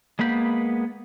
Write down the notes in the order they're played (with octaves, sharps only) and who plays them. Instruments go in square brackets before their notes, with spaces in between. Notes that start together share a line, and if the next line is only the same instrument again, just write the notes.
[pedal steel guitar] G#3 A#3 B3 B5 G6